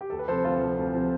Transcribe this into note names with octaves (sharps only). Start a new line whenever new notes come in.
G4
D2 A4
B4
C3 F3 A4 C5
D2 F4 A4
C3 F3
D2
C3 F3